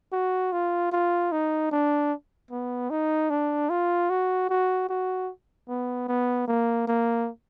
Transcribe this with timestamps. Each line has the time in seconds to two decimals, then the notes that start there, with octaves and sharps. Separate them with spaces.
0.13 F#4
0.52 F4
0.92 F4
1.32 D#4
1.72 D4
2.51 B3
2.90 D#4
3.30 D4
3.70 F4
4.10 F#4
4.49 F#4
4.89 F#4
5.68 B3
6.09 B3
6.48 A#3
6.88 A#3